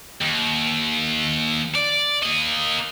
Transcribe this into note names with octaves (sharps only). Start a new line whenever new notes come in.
D#2
D5
A#3 D#5